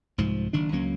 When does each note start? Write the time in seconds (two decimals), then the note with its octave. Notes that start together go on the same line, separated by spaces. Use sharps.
0.18 C2 G#2 F3
0.53 F#1 D#3 D4
0.72 C#2 F#3 A#3 C#4